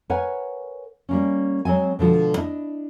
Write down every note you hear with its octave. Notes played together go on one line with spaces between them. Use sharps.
A#4 B4 C#5 F#5 G#5
G3 A#3 C#4
F#3 G#3 C4 G#5
B2 D3 F3 G#3
D4 E4 D#5